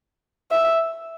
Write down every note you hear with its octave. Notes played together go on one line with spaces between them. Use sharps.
E5